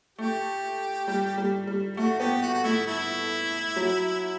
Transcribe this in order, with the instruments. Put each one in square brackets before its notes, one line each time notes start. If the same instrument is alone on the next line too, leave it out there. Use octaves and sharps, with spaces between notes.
[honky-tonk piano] A3 [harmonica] G4
[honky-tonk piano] G3
G3
G3
[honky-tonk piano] A3 [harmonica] F#4
[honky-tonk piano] B3 [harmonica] G4
[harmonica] F#4
F#4
[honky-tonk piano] A3 [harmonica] E4
[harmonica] E4
[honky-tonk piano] F#3